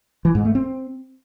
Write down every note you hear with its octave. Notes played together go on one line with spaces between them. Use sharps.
E3
G#2
A3
C4